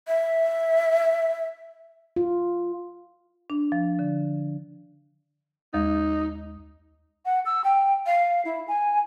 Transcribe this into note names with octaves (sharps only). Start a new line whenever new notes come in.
E5
F4
D4
F3
D3
D#2 G#3 D#4
F#5
E6
G5
F5
E4
G#5